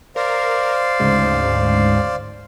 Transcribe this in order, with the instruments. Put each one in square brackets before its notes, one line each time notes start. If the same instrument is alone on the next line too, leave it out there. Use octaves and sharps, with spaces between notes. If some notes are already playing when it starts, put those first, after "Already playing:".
[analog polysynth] A#4 [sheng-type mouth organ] C5 D5 F5
[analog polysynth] D2 G#2 C#3